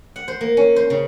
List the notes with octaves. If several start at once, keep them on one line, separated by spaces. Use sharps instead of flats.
F#5
C5
A#3
C#4
C5
C#3